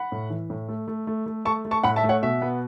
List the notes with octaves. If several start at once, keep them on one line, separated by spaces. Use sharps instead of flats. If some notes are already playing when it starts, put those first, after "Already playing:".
Already playing: F#5 B5
A2
E3
A2
A3
A3
A3
A3
A3 A5 C#6
A3
A5 C#6
A2 F#5 B5
E5 A5
A3
C#5 F#5
B2 E5
B3